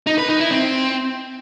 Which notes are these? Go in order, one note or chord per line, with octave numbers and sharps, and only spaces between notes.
D#4
B4
D#4
E4
C4